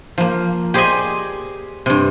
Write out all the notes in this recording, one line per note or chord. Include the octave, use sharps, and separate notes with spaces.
F3 A#3
G4 G#4 C5 D5 D#5 G#5
G2 C3